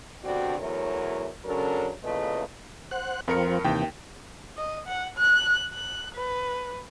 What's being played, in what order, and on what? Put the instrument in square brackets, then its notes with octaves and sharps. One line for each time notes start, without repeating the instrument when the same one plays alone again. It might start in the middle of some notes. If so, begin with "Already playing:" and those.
[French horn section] G2 B2 D3 C4 F#4 D5
E2 F#3 A3 E4 A#4 C#5
C#3 F#3 C#4 D4 A4 A#4
E2 A#2 C#3 A3 B4 D#5
[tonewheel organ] C5 F#5 F#6
[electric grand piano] F2 A#4 C#7 [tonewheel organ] F3 C4
[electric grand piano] D#2 G5 [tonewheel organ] C3 E3
[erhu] D#5
F#5
F#6
F#6
B4